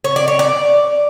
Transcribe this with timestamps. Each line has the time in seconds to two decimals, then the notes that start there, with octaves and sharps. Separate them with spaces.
0.04 C#5
0.16 D5
0.28 C#5
0.39 D5